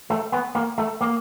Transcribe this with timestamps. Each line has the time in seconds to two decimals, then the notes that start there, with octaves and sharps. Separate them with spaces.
0.10 A3
0.32 B3
0.55 A#3
0.78 A3
1.01 A#3